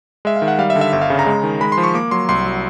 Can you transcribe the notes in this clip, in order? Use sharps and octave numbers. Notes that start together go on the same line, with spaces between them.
G#3 E5
F5
D#3
F#5
G3 F5
E5
D3
E5
G1 E5
F5
C#3
A#5
G#3
D#3
G#3 B5
C6
F3
C#6
A#3 D6
F#3 C6
C2 C6
F#3